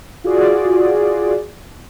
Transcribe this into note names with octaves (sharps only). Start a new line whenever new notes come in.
F4 F#4 G#4 D5